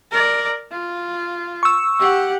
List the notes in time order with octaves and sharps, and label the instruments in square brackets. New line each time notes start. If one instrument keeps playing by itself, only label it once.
[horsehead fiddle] A#4 D5
F4
[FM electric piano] C#6 E6
[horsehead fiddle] G4 F#5